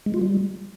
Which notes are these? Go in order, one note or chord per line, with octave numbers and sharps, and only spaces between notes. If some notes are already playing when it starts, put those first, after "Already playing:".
G#3
F4
G3